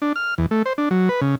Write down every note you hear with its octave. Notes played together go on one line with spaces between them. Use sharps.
D4
F6
E2
A3
C5
D4
F#3
B4
C#3